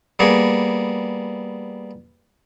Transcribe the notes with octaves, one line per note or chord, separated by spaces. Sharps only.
G3 A#3 B3 G#4